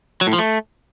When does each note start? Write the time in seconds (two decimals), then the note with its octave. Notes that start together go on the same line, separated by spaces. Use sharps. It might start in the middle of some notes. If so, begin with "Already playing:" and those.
0.21 F#3
0.27 A2
0.33 F3
0.39 A3